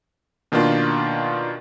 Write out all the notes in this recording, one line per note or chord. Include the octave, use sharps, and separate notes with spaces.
B2 D#3 A#3 D4 F4